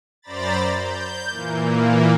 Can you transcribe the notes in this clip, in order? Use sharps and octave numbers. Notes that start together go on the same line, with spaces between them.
F#2 C5 D5 A#5 B5 A6
G6
A#2 E3 A#3